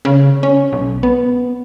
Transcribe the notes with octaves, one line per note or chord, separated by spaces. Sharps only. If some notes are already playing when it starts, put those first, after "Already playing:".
C#3
C#4
B1
B3